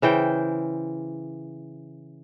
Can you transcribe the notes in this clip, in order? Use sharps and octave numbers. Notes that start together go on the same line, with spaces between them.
C#3 E3 C5 G5